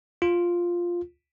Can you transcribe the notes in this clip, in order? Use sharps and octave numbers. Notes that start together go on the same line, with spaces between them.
F4